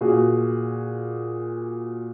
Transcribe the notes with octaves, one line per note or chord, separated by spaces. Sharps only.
A#2 F#4 G#4